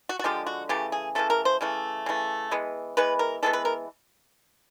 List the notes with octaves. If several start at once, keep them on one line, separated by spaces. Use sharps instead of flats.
F#4
F#4
D3 F3 G#3 G4
F#4
C#3 E3 A3 G4
G#4
C#3 E3 A3 A4
A#4
C5
C#3 E3 A3
C#3 E3 A3
E3 G#3 B3
E3 G#3 B3 B4
A#4
E3 G#3 B3 A4
B4
A#4